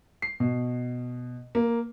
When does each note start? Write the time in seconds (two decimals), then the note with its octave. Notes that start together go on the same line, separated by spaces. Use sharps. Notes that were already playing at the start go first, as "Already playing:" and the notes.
0.22 C7
0.40 B2
1.55 A#3